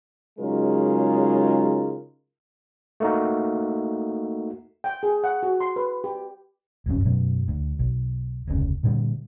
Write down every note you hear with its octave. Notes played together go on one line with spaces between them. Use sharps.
C#3 F#3 G#3 D#4 F4 A#4
A3 A#3 D#4 F#4
G5
G#4
F#5
F#4
C6
B4
G4
D1 G1 F#2 C#4
F#2 B2 F#3
D2
B1
F1 D2 C#3
A#2 D3 F3 G3